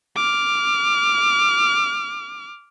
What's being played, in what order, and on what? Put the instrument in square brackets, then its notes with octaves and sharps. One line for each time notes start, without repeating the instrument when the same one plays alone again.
[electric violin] D6 F6